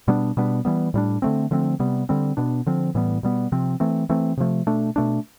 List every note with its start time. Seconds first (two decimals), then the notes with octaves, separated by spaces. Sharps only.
0.08 B2 G3 B3 D4
0.37 B2 G3 B3 D4
0.65 E3 G3 B3
0.94 A2 G3 D4
1.22 D3 A3 C4
1.51 D3 F3 A3 C4
1.80 C3 G3 B3
2.09 D3 G3 C4
2.37 B2 B3 D4
2.66 D3 F3 C4
2.95 A2 E3 G3 B3
3.23 B2 G3 B3
3.52 C3 F3 C4
3.80 E3 A3 C4
4.09 E3 A3 C4
4.37 C3 F3 A3
4.67 B2 A3 D4
4.96 B2 A3 D4